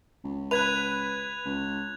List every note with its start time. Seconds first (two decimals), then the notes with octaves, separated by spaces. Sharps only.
0.24 C#2
0.51 B4 F#6 G#6 F7
1.45 C#2